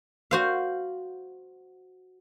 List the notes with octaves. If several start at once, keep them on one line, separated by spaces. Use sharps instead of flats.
F#4 C5 F5